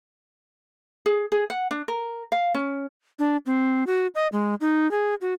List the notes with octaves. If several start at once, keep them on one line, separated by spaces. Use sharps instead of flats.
G#4
G#4
F#5
D4
A#4
F5
C#4
D4
C4
F#4
D#5
G#3
D#4
G#4
F#4